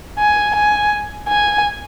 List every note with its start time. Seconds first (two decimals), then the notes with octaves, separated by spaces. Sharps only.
0.18 G#5
0.55 G#5
1.28 G#5